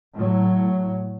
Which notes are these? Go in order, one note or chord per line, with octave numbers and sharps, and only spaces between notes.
A2 F#3